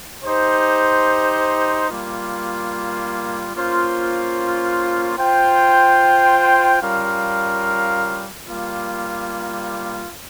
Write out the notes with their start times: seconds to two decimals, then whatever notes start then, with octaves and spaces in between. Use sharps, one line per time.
0.24 D#4 G4 C5
1.89 G3 A#3 F4
3.52 A#3 C#4 F4 C5
5.17 F4 C5 G5
6.80 G3 C#4 F4 A#4 F5
8.45 G3 A#3 F4